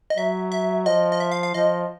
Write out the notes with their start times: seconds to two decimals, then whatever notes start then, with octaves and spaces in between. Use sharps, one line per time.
0.10 D#5
0.17 F#3 E5
0.52 E5
0.86 F3 D#5
1.12 D#5
1.20 E5
1.32 F5
1.43 F5
1.54 F3 D#5